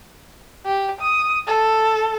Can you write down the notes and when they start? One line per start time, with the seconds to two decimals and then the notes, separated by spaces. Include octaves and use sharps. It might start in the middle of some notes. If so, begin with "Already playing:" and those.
0.66 G4
1.00 D#6
1.47 A4